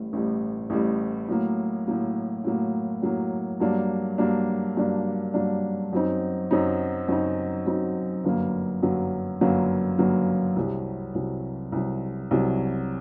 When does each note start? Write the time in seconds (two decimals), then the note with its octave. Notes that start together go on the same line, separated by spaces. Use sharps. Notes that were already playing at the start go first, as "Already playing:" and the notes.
Already playing: A1 A2 G3
0.13 A1 A2 G3
0.70 A1 A2 G3
1.28 A2 F#3 A#3
1.87 A2 F#3 A#3
2.44 A2 F#3 A#3
3.02 A2 F#3 A#3
3.60 G2 F#3 A#3 D4
4.18 G2 F#3 A#3 D4
4.77 G2 F#3 A#3 D4
5.34 G2 F#3 A#3 D4
5.93 F#2 F#3 C4 D#4
6.51 F#2 F#3 C4 D#4
7.09 F#2 F#3 C4 D#4
7.67 F#2 F#3 C4 D#4
8.25 G1 F#2 F#3 A#3
8.83 G1 F#2 F#3 A#3
9.41 G1 F#2 F#3 A#3
9.98 G1 F#2 F#3 A#3
10.56 C2 C3 F#3
11.15 C2 C3 F#3
11.72 C2 C3 F#3
12.31 C2 C3 F#3